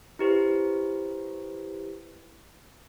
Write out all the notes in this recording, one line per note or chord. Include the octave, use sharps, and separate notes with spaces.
E4 G4 B4 C5